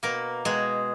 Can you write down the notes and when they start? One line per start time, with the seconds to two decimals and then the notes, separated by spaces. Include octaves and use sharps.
0.03 B2 A#3 A#4
0.45 B2 G#3 G#4